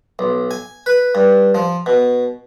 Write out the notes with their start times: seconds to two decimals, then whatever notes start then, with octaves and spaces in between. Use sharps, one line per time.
0.19 B1
0.51 G#5
0.86 B4
1.15 G2
1.55 F3
1.86 B2